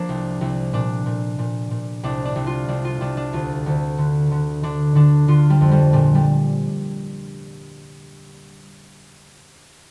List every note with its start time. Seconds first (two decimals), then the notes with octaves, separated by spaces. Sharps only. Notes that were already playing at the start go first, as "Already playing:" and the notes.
Already playing: F3 A#3 D4
0.09 C2
0.41 C2
0.73 A#2 D4
1.06 A#2
1.39 A#2
1.71 A#2
2.03 C2 D4
2.25 D4
2.35 C2
2.47 F4
2.68 C2 D4
2.85 F4
3.01 C2 D4
3.17 D4
3.33 D2 F4
3.66 D2
3.98 D3
4.31 D3
4.63 D3 D4
4.95 D3 D4
5.28 D3 F4
5.50 G3
5.61 F2
5.71 G3
5.93 A#2 G3
6.15 G3